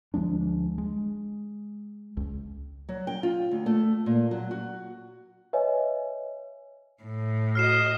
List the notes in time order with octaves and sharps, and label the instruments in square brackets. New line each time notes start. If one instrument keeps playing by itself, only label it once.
[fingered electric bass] D2 F3 G#3 D4
G#3
C#2
[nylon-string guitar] F#3
G5
F4
D2
A3
A#2
F#3
F#4
[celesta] B4 C#5 D#5 E5 G#5
[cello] A2
[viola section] F#4 D#5 [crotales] F6 C7 E7